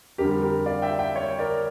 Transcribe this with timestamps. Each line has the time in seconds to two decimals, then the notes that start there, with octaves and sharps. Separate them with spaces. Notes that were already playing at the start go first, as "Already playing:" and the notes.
0.18 F2 D3 G3 G4 A#4
0.42 G4 A#4
0.66 D5 F5
0.82 E5 G5
0.99 E5 G5
1.15 C#5 E5
1.39 A#4 D5